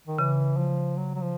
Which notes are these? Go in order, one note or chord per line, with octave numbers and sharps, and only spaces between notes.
D#3
C#3 E3
F3
F#3
F#3
F3